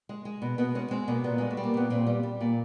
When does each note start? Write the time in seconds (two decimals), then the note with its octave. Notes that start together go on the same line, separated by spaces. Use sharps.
0.09 G#3
0.25 G#3
0.42 B2
0.58 B2 B3
0.75 G#3 C#4
0.91 G#3 C4
1.08 B2 A#3
1.24 A#2 B3
1.38 G3 G#3
1.51 A3
1.57 G3
1.64 A#3
1.74 A#2 B3
1.90 A#2 C4
2.07 G3
2.23 G3
2.41 A#2